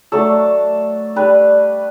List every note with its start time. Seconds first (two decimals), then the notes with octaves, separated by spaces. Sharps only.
0.12 F#3 A3 D4 A4
1.16 G3 D4 B4